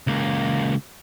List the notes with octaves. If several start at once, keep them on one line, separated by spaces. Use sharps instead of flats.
C#2 A#3